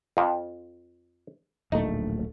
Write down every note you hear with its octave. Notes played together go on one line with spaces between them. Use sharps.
F2 F3
D1 A#1 A3 D#4